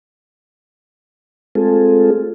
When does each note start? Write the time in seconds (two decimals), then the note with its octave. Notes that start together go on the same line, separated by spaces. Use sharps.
1.55 G#3 A3 C4 F4 G#4 A4